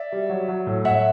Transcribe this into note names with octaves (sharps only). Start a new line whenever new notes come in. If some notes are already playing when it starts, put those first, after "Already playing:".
Already playing: D5 E5
G3
F#3
F#3
A2
A2 E5 F#5